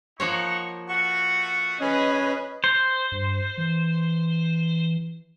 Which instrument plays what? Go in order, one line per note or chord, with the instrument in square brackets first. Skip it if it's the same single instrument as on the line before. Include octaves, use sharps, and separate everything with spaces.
[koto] F3 A#3 C#5 [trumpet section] D#4 F#5 C#6
[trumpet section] A3 F#4 [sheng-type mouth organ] F#5 C#6
[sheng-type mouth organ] C#4 [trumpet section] G#4 [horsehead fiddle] B4 D#5
[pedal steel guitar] C5
[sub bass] G2
E3